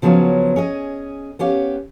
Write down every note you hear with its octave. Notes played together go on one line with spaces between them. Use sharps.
C#3 F3 F#3 B3 C#4
C#4 G#4 D#5
B3 C#4 G4 F5